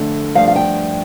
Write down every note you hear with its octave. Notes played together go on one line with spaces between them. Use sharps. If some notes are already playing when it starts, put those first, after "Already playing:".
Already playing: F2 D3 A3
G2 F3 A3 F5
F5
G5